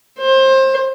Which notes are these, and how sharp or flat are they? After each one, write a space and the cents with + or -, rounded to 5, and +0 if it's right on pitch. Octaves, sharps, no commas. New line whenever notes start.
C5 +25